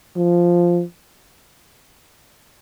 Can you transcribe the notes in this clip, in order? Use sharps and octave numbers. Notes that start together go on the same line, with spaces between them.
F3